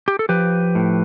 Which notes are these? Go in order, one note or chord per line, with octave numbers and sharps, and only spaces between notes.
G4
A4
F3 G4 B4
A2